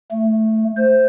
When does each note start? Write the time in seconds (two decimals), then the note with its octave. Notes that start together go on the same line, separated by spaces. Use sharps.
0.11 A3
0.77 C5